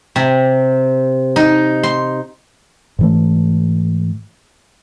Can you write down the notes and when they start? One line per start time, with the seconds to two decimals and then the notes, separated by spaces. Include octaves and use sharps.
0.16 C3
1.36 D#4
1.83 C6
2.99 G#2 E3 A3